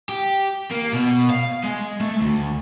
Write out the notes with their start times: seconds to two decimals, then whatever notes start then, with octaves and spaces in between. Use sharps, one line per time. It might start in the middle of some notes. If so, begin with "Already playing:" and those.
0.09 G4
0.71 A#3
0.93 B2
1.30 F5
1.64 G#3
2.01 A3
2.20 D2